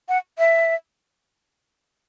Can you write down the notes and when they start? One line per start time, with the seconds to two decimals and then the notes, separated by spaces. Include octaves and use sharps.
0.09 F#5
0.38 E5